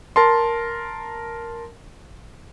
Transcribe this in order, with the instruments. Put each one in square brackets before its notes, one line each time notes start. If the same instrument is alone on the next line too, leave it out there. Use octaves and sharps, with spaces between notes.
[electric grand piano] A#4 A5 C6